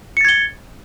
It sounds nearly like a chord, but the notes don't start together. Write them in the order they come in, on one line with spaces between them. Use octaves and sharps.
C#7 A6 G#6 G7